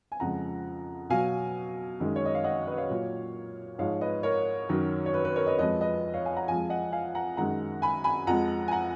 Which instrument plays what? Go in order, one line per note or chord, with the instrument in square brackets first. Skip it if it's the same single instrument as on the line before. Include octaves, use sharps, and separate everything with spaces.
[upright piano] G#5
F2 C#3 F3 G#3 F#5 A#5
B2 F#3 F5 G#5
F#2 D#3 G#3
C#5
D#5
F5
D#5 F#5
B4 D#5
C#5 F5
A#2 F#3
G#2 F3 G#3 C#5 F5
B4 D#5
A#4 C#5
F#2 D#3 F#3
C#5
B4
B4
A#4 C#5
B4 D#5
F2 F3 G#3 B4 D#5
B4 D#5
C#5 F5
F5 G#5
F#5 A#5
F2 F3 G#3 F5 G#5
D#5 F#5
F5 G#5
F#5 A#5
F#2 D#3 G#3 F#5 A#5
G#5 B5
G#5 B5
F2 F3 G#3 F#5 A#5
G#5
F#5 A#5